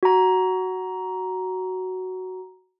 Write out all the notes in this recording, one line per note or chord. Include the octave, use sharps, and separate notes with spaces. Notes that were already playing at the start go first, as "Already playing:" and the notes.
F#4 A#5